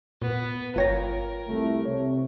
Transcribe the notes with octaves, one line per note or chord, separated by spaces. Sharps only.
A#2 B3
G1 F4 A#4 C#5 G5 A#6
C2 A3
C3 C#5